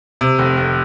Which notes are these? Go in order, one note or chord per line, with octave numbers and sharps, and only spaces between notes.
C3
F1
F1